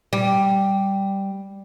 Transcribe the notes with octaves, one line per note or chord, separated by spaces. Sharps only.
G3